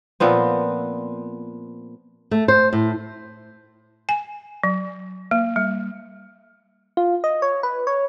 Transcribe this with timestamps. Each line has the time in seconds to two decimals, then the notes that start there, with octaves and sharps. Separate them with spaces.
0.20 A#2 F3 B3 C4
2.31 A3
2.48 C5
2.73 A2
4.09 G#5
4.63 F#3
5.31 A#3
5.56 G3
6.97 F4
7.24 D#5
7.42 C#5
7.63 B4
7.87 C#5